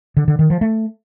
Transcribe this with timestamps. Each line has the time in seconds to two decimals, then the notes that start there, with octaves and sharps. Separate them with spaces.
0.17 D3
0.28 D3
0.39 D#3
0.50 F3
0.61 A3